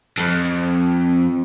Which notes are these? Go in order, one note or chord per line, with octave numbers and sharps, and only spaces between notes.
F2